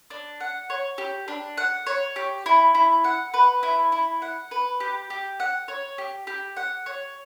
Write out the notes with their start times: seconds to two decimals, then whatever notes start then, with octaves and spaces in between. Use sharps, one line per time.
0.10 D4
0.40 F#5
0.70 C#5
0.98 G4
1.28 D4
1.57 F#5
1.87 C#5
2.16 G4
2.46 E4
2.75 E4
3.04 F#5
3.34 B4
3.63 E4
3.92 E4
4.22 F#5
4.51 B4
4.80 G4
5.10 G4
5.40 F#5
5.68 C#5
5.98 G4
6.27 G4
6.57 F#5
6.86 C#5